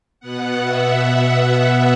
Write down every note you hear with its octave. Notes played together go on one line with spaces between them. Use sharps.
B2 B3 F#5
E5